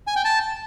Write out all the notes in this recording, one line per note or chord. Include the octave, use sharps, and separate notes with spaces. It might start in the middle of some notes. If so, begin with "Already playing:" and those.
G#5
G5
A5